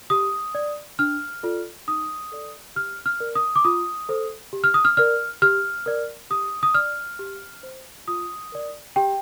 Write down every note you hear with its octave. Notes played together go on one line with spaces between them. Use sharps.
G4 D#6
D5
D4 F6
F4 A4 D5
D#4 D#6
A4 D5
G4 F6
F6
A#4 D5
D#6
D6
F4 D#6
A4 C5
G4
F6
D#6
F6
A#4 D5 F6
G4 F6
A#4 D5
G4 D#6
D#6
D5 F6
G4
C5
F4 D#6
A#4 D5
G4 G5